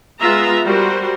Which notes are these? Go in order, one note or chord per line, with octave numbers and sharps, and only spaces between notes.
G#3 B3 F4 E5 A#5
G3 F#4 A#4 C5